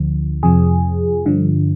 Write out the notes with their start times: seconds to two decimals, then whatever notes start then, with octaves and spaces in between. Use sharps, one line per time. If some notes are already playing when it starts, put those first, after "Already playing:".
Already playing: D2 D3 F3
0.43 F2 C3 F3 G#4
1.26 G2 D3 F3